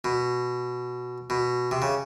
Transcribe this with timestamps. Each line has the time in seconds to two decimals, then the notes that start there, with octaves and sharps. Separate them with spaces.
0.04 B2
1.30 B2
1.71 C3
1.82 C#3